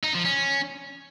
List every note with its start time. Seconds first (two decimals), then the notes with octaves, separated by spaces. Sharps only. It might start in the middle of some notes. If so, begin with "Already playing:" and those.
0.03 D#4
0.14 F3
0.25 C#4